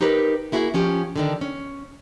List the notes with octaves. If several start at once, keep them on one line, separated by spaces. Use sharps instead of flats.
D#4 G4 A#4 B4
A#3 E4 F#4 G#4
F3 C#4 F4 G4
D3 D#3 D4
C#4